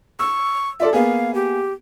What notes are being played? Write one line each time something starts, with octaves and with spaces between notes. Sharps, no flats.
C#6 E6
F4 A4 D5 E5
A#3 B3 G#4 F5
G4